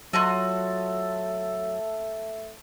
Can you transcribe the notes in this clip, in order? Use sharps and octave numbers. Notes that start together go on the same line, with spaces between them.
F#3 A3 F4 F#4 A4 D#5